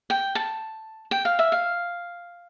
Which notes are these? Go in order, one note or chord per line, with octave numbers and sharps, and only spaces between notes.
G5
A5
G5
F5
E5
F5